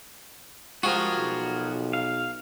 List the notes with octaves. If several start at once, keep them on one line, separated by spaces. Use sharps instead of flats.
F3 G3 G#3 F4 F#4 G#4 A#4
B1
F5